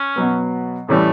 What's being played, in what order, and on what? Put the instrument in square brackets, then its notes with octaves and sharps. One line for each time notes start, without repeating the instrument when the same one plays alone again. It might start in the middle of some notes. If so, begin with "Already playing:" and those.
Already playing: [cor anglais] C#4
[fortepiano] B2 F#3 B3
[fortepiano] A2 E3 G3 C#4 [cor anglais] A3